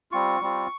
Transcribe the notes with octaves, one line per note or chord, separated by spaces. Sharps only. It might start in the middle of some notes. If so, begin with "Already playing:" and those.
G3 C4 F4 C#6
G3 C4 F4